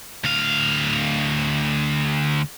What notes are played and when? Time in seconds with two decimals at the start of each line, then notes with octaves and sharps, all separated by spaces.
0.24 D2 F5